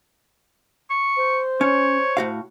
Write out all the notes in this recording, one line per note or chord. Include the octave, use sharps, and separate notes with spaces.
C#6
C5
C#4 C#5
A2 F#4 F5